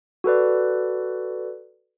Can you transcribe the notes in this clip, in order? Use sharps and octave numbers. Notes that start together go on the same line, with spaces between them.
F#4 A4 B4 D5